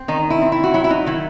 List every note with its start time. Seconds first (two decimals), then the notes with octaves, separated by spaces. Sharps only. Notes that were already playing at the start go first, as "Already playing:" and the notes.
Already playing: C4
0.08 D#3 D#4
0.30 E4
0.41 C4
0.52 E4
0.64 F#4
0.74 F#3 E4
0.84 E4
0.90 D#4
1.06 D#3 E4